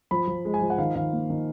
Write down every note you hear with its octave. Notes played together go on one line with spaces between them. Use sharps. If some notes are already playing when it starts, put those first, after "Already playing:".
F3 B5
F3
G#3
G#5
F3
F#5
D#3 F5
D#3 F5
A#3
D#3